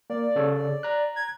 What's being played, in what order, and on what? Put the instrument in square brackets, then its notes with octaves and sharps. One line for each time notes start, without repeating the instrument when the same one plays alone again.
[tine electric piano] A#3 [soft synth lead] D5
[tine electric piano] C#3 A4 C#5
A#5 F#6
[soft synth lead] G#6